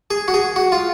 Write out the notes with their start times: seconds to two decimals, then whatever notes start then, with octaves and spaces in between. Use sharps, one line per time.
0.11 G#4
0.28 F#4
0.34 G#4
0.56 F#4
0.72 F4